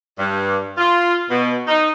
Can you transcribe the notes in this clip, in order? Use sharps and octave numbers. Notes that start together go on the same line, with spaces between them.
G2
F4
B2
D#4